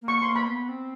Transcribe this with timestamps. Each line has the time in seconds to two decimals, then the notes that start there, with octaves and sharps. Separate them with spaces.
0.02 A#3
0.08 C#6
0.22 A#3 C6
0.36 B5
0.46 B3
0.69 C4